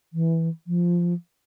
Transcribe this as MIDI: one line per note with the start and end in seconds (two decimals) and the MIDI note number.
0.13 0.49 52
0.67 1.14 53